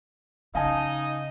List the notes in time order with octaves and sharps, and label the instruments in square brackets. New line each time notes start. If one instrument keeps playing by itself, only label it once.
[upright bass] C#3 [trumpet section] D#4 D#5 [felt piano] F5 G#5 A5